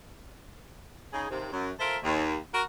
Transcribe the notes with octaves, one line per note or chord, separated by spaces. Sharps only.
C#3 D#4 G#4
D#2 C3
F#2
F4 A4 A#4 C5 E5
D#2
F#4 A#4